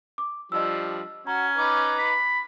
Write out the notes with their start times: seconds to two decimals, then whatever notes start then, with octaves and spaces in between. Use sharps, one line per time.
0.18 D6
0.52 F3 G3 D4 D#5 E6
1.27 C#4 F#4 A#5
1.58 D#4 B4 D6
1.98 B5